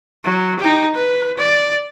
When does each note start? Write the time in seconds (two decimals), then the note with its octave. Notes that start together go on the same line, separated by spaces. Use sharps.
0.24 F#3
0.59 D#4 G4
0.94 B4
1.37 D5